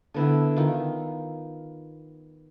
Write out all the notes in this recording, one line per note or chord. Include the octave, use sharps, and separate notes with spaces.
D3 B3 E4
D#3 F4